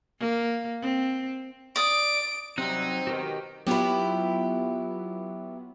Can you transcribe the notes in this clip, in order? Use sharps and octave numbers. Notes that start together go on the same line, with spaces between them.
A#3
C4
D5 D#6 D7
C3 F#3 G3 C4 D#4 F#6
G#1 B2 D#3 F#4 G4 G5
F#3 B3 E4 F4 G4